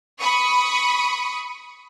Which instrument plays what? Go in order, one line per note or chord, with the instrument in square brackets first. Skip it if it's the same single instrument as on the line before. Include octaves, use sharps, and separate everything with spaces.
[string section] B5 C#6 D#6